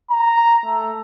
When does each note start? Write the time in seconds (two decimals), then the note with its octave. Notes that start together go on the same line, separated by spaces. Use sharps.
0.11 A#5
0.65 A3